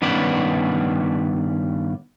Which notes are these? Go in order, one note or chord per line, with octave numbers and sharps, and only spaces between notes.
G2 D#3 B3 C#4 B4 D5